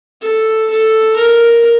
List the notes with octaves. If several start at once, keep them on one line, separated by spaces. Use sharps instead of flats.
A4
A4
A#4